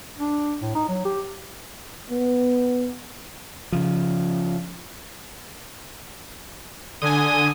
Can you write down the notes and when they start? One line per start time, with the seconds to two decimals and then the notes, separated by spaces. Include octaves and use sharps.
0.18 D4
0.61 A2
0.75 D#4
0.88 F#3
1.05 G4
2.10 B3
3.72 C#3 F3
7.02 D3 G#5 D#6